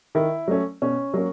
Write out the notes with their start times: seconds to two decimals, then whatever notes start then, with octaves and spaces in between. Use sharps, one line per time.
0.15 D#3 E4
0.48 F#3 A3 C#4
0.82 B2 C#4
1.14 F#3 A#3 C#4